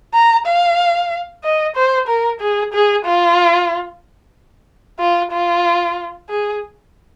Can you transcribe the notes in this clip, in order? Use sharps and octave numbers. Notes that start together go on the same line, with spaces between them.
A#5
F5
D#5
C5
A#4
G#4
G#4
F4
F4
F4
G#4